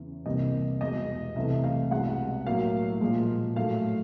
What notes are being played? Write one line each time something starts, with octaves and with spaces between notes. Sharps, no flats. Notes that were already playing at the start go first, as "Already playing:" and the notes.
Already playing: E2 C#3 E3
C2 C3 E3 G3 A#3 D#5
E2 B2 G#3 D#5
C2 C3 E3 A3 E5
F5
C2 B2 G#3 F#5
A2 F#3 A#3 F5
A#2 F3 G#3
A2 F#3 A3 F5